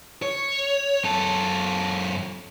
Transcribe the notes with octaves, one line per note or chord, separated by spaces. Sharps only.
C#5
F#2 A4